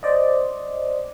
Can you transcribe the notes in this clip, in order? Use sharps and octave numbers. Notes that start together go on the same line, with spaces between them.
C5 D5 D#5